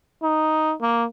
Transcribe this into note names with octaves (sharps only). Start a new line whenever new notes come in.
D#4
A#3